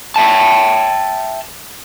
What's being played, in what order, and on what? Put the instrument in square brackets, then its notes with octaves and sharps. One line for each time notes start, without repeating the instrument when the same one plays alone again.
[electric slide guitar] E5 G5 A5